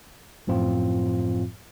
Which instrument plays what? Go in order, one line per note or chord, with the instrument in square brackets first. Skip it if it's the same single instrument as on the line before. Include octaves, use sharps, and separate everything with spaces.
[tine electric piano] F#2 A2 F3 C4 F4